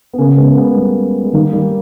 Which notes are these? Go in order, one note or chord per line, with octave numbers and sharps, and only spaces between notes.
B3
C#3 A#3 C#4
G#3 B3
A#3
G#3 B3
G3 A#3
G#3
D#3 G3 A#3
G3 A#3